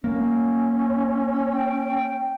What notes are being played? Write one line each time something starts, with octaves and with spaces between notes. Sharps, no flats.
A#3 C#4
G5